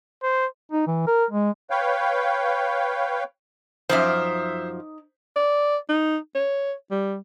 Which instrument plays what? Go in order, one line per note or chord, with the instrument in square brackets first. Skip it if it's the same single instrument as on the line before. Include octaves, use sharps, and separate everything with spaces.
[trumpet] C5
[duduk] D#4
E3
A#4
G#3
[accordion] B4 C#5 F5 G5
[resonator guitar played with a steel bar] F#2 F3 [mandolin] D#4 D6 F6 [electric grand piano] C5 E5
[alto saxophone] D5
D#4
C#5
G3